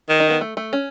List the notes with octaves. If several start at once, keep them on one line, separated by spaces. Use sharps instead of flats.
D#3
D#4
B3
A3
A3
C#4